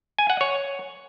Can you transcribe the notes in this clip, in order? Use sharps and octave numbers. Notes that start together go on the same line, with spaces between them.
G#5
F#5
C#5